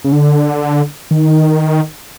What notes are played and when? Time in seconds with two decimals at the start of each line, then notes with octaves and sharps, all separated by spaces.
0.04 C#3
0.12 D3
1.11 D#3